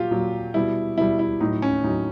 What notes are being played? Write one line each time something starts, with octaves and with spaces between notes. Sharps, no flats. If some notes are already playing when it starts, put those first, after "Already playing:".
Already playing: A#2 F#3 F4 G4
A#2 F#3
B2 G3 E4
B2 G3 E4
E4
A2 F#3 D#4
C#4
A2 F#3 D#4